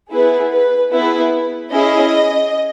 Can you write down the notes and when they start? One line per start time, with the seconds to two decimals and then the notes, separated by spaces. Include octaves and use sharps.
0.12 B3 E4 G#4 B4
0.52 B4
0.92 B3 E4 G#4 B4
1.71 C#4 E4 G#4 D#5